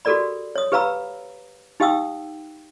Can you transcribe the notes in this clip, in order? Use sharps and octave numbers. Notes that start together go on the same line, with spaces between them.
F#4 G4 A4 A#4 D5 B5
C#5 D#6
G4 B4 F5 A#5 B5 E6
D#4 G4 F5 G5 D#6 E6